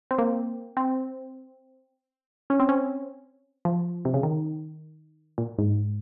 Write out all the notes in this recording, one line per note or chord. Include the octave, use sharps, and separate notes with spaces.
C4
A#3
C4
C#4
C4
C#4
F3
C3
C#3
D#3
A#2
G#2